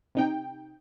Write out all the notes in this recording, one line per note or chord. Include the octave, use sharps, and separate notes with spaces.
C3 D#4 G5